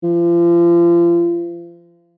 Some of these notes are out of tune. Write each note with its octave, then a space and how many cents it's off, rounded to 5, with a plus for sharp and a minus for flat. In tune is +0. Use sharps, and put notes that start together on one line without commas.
F3 -35